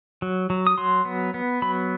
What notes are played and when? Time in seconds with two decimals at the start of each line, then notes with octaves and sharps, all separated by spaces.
0.22 F#3
0.50 F#3
0.67 D#6
0.78 F#3 C6
1.05 B3
1.34 B3
1.62 F#3 B5